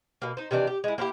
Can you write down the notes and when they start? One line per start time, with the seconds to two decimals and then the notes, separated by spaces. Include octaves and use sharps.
0.22 B2 A#3
0.37 D#4 C5
0.51 C3 D#3 E3 D4
0.67 G4
0.84 G#3 E4
0.98 A#3 D4 E4 G4